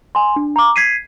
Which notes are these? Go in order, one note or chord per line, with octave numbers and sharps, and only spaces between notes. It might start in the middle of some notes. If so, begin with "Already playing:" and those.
G#5 C6
D4
A#5 D6
G#6 B6 C7 D#7